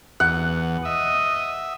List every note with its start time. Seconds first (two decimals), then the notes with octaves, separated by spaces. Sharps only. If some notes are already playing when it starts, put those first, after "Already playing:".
0.20 E2 F#5
0.85 D#5 E5